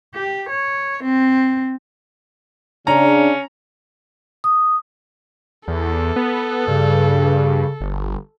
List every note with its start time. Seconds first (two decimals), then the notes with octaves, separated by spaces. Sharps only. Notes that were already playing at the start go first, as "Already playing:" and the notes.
0.14 G4
0.50 C#5
1.04 C4
2.87 C#3 C#4 D4 A#5
4.44 D#6
5.68 E2 A4
6.16 B3
6.68 G2 C#3
7.80 G1